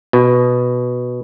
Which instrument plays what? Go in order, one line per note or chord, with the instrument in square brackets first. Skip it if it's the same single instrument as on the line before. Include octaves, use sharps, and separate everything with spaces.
[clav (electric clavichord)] B2